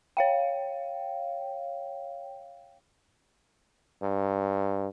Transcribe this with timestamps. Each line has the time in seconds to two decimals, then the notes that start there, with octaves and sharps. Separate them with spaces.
0.17 C#5 F5 G5
4.02 G2